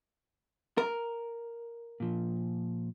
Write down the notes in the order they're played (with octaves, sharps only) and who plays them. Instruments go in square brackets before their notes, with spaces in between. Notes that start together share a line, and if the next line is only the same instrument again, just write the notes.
[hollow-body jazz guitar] A#4
[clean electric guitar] A#2 F3